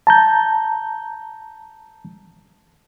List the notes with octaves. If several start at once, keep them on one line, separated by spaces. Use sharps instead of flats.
A5 A#5 G6